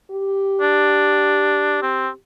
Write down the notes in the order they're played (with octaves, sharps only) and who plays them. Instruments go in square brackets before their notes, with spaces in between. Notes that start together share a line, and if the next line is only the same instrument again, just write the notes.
[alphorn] G4
[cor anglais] D4
C4